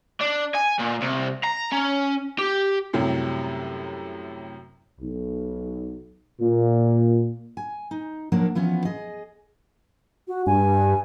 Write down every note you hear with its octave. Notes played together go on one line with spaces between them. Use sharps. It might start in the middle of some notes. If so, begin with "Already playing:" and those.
D4
G#5
A#2
C2
A#5
C#4
G4
F#2 A2 C3 F#3 G3
B1
A#2
G#5
D#4
F3 F#3 A#3 D4 A#4 C#5
E3 F3 B3 C#4
G#4 D#5
F#4
G2 G#5